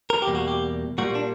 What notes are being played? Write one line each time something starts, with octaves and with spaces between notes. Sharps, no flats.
A#4
G4
E2 B2 G3 A#3
F#4
G4
A#2 G3 A#3 F#4
D4